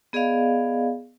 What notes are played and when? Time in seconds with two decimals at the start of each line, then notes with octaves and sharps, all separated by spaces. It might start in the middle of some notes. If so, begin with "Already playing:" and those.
0.13 B3 G#4 D5 D#5 F5